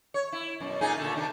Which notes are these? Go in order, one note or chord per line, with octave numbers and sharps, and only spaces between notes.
C#5
E4
F#2 B2
A#2 D#4 G#4
A#2 D3 A3
C3 D#3 D4